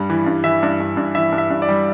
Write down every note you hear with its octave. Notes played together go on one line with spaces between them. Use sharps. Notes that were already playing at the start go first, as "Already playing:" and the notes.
Already playing: G2 G3
E3
G2
E3 E5
G2
G2
G2
E3 E5
G2
E5
G2
D5
G3